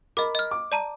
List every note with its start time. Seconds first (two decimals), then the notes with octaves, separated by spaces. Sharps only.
0.17 A#4 D#5 B5 D6
0.35 D#5 F6
0.51 D6
0.72 D5 A5 A#5